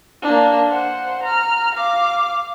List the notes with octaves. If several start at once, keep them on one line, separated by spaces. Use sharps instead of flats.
A#3 D4
C5 F#5
A#5 F6
F5 D6